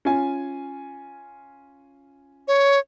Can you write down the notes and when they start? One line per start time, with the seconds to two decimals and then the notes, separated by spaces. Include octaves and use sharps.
0.05 C#4 F4 G#5
2.48 C#5